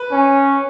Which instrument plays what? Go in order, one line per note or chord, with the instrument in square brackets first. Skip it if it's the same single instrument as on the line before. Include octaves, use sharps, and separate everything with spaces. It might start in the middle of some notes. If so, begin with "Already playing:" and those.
Already playing: [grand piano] B4
[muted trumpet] C#4